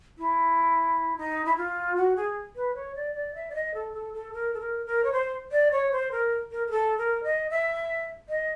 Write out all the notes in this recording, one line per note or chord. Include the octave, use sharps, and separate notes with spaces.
E4
D#4
E4
F4
F#4
G#4
B4
C#5
D5
D5
E5
D5
D#5
A4
A4
A4
A#4
A4
A#4
A#4
C#5
C5
D5
C#5
C5
A#4
A#4
A#4
A4
A#4
D#5
E5
D#5